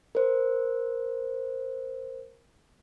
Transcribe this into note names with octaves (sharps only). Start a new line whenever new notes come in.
A#4 C5